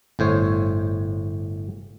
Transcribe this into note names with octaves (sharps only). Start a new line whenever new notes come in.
G1 A2 C5 C#5